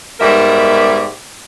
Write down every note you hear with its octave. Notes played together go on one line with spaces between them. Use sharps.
G#2 B2 G3 A#4 E5